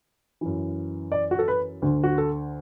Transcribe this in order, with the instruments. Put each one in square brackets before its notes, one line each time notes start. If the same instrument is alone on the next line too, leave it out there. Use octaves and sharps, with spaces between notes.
[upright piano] F#2 E3
D5
F#4
A4
B4
D2 D3
F#4
A4